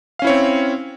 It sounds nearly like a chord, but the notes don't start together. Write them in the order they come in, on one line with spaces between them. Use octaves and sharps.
F5 C#4 E4 C#5 C4